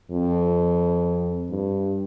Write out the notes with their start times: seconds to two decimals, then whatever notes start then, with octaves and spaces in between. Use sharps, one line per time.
0.11 F2
1.50 G2